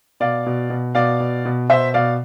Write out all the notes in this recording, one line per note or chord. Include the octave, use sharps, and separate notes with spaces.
B2 D5 F5
B2
B2
B2 D5 F5
B2
B2
B2 C5 E5
B2 D5 F5